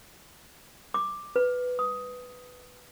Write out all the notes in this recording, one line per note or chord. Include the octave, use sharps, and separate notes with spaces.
D6
B4
D#6